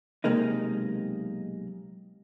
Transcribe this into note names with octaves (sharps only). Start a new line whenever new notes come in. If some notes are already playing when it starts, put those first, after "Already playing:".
B1 C3 G#3 A#3 D#4